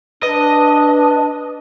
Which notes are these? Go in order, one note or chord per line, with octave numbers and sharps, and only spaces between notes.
D4 B4 D#5